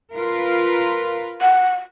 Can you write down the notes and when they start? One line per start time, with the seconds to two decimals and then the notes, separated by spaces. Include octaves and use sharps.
0.15 F4 A#4 B4
1.41 F#5